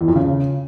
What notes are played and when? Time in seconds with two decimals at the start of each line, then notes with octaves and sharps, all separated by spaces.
0.01 E2
0.08 F2
0.15 C#3